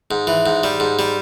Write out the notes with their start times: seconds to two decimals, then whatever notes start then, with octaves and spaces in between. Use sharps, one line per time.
0.11 G#2
0.27 E3
0.46 G#2
0.63 G3
0.80 G#2
0.99 G3